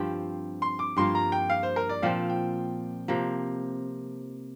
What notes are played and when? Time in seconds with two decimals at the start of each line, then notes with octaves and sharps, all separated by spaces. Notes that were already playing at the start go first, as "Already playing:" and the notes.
Already playing: G2 F3 C4 G4
0.62 C6
0.79 D6
0.97 G2 F3 A#3 F4 C6
1.15 A#5
1.32 G5
1.50 F5
1.63 C5
1.76 A#4
1.89 D5
2.02 A#2 F3 C4 F5
2.30 G5
3.08 C3 F3 A#3